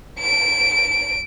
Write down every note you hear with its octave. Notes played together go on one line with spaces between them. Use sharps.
D7